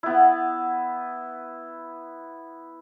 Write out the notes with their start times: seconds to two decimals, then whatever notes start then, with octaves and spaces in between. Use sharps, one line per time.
0.03 B3 E4